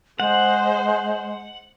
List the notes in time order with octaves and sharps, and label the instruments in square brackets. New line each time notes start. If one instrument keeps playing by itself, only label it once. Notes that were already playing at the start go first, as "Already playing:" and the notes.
[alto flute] G#3 [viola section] C5 [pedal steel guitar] F#5